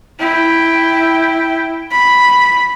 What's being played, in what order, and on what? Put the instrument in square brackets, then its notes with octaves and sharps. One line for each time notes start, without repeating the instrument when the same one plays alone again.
[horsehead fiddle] E4 G5
B5